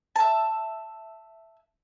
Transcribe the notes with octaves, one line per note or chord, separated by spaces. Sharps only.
E5 A5